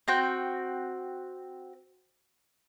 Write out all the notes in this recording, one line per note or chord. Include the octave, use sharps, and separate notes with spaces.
C4 F#4 G5